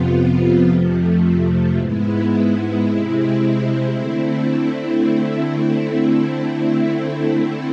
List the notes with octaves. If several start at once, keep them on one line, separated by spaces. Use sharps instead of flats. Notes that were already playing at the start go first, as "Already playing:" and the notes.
Already playing: F2 C3 F3 B3 F4
F2 C3 F3 A3
G#2 G#3 B3 E4
C3 G#3 C4 E4
D3 A3 C4 E4